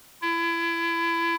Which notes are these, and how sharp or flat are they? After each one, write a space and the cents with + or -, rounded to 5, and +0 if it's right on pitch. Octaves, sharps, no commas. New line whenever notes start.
E4 +30